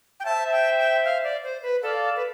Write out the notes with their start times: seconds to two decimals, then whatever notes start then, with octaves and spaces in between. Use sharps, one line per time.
0.20 G5
0.25 C5 E5 A5
0.52 G5
0.78 G5
1.04 F5
1.24 D5
1.44 C5
1.63 B4
1.82 A4 D5 F5
2.16 B4